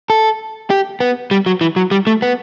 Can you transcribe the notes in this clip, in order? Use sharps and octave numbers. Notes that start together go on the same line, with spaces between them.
A4
G4
B3
G3
F#3
E3
F#3
G3
A3
B3